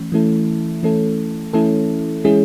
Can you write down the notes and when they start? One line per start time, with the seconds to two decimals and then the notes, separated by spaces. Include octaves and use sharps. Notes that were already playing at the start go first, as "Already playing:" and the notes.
Already playing: E3 A3 C#4
0.12 E3 A3 C#4 E4 A4
0.83 E3 A3 C#4 E4 A4
1.53 E3 A3 C#4 E4 A4
2.24 E3 G#3 C#4 E4 G#4